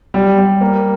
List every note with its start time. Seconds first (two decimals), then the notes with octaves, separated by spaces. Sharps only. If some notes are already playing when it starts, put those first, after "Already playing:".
0.14 G3
0.38 G3
0.61 A#3